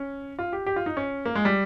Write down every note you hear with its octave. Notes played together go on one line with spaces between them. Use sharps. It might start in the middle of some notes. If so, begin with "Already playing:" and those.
Already playing: C#4
F4
G4
G4
F4
D#4
C#4
A#3
G#3
G3